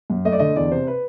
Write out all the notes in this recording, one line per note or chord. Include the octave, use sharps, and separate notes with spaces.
F#2
A3 D#5
D5
D3 D#5
E2 D5
C3 C5
B4